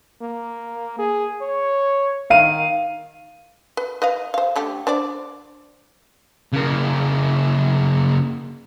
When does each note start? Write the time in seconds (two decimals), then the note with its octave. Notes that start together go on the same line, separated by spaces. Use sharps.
0.21 A#3
0.99 G#4
1.42 C#5
2.30 D#3 F5 D#7
3.77 B4
4.02 B4 D#5 F5
4.34 C5 F5
4.56 D3 A3 G4
4.87 D4 C5 D5
6.53 C#3 A#3